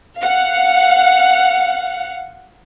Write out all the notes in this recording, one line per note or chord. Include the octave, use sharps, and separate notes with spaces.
F5 F#5